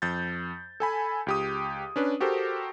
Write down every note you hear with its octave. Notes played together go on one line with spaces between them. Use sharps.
F2 G6 A6
A4 G#5 B5
C#2 G4 D#6
C#4 D4 B4
F#4 G4 A4 A#4 C5